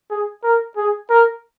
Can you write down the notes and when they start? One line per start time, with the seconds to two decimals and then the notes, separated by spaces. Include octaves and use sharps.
0.10 G#4
0.43 A#4
0.76 G#4
1.10 A#4